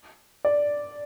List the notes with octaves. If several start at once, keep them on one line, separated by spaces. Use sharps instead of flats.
D5